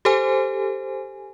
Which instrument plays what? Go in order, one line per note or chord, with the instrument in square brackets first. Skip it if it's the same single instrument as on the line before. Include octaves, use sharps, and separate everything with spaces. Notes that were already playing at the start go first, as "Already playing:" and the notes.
[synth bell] G4 A4 C5 G#5